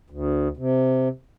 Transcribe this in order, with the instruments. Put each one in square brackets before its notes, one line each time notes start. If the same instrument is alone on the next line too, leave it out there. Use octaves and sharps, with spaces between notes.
[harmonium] D2
C3